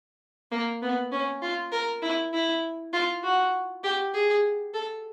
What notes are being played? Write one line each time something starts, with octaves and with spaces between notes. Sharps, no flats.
A#3
B3
C#4
F4
A#4
E4
E4
F4
F#4
G4
G#4
A4